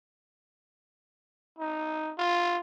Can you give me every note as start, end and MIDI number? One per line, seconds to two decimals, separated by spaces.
1.59 2.13 63
2.18 2.59 65